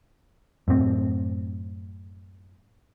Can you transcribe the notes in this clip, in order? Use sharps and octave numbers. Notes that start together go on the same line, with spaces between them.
F#2 A2 C4